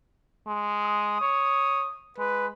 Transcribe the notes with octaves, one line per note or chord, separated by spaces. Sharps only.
G#3
D#6
C#5
G#3 B4